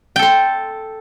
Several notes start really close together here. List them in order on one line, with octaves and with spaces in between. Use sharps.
G5 A4 C6